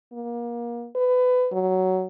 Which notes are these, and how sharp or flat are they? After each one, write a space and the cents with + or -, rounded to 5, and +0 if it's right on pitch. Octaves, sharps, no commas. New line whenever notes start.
A#3 +30
B4 +25
F#3 +10